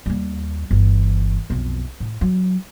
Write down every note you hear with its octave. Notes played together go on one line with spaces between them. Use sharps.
D#2 G3
G1 E3
B1 F2
A2
F#3